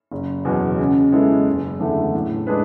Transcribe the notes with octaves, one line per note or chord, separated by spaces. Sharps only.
F#1
E2 B2 F#3
C#3
G#3 B3 E4 A4
F#1
E2 D3 A3 E4
A2
G#3 D4 G#4 B4